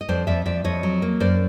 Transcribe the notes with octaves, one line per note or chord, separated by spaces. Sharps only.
D#5
F2 C5 D5
F2 D5 E5
F2 D5 E5
F2 C#5 D#5
F#3
A#3
F#2 C5 D5